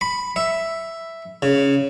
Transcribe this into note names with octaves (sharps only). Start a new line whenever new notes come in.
B5
E5
C#3